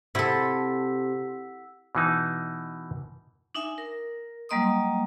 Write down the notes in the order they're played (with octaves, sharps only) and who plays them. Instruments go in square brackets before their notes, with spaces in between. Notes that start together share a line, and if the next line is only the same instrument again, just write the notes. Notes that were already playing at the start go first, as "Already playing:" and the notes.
[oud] C3 [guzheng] E4 A4 [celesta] F#5 E6 B6
[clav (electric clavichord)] B2 E3 D#4
[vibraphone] D4 D#4 E5 G#5
A#4
F#3 G3 A#3 D#5 C6 D#6